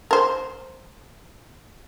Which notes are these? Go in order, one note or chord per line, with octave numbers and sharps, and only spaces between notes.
A#4 C5